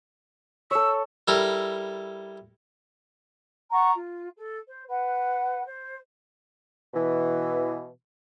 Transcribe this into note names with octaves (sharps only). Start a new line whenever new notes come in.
A4 C#5 E6
G3 E4 A4 A#4
F#5 A5 A#5 C#6
F4
A4
C5
B4 F#5
C5
B2 E3